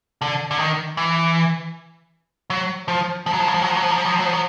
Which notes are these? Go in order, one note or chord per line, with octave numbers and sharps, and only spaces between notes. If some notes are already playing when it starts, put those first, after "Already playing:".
D3
D3
D#3
E3
F#3
F3
F3
F#3
F3
F#3
F3
F#3
F3
F#3
F3
F#3
F3
F#3
F3
F#3
F3
F#3